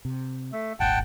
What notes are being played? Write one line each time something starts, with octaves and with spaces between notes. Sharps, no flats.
C3
A3
D#1 G#1 F#5 G5 A5